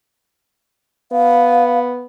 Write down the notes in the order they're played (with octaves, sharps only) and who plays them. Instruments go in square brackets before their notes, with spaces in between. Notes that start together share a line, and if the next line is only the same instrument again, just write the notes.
[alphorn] B3 [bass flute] F5